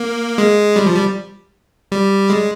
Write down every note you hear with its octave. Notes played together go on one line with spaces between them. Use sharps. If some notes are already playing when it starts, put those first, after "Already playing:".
Already playing: A#3
G#3
G3
F3
G3
G3
G#3